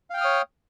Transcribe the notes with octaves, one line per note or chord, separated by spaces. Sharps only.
C#5 F5 G5 D#6 F6